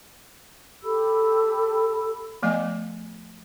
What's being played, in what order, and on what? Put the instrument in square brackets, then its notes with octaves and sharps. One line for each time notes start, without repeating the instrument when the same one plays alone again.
[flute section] G4 A4 B5 E6
[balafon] F3 A3 B3 D#5 G#5